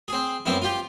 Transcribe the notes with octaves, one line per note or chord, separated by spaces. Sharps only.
C4 G#4
F#2 B3 C4 E4
F4 G4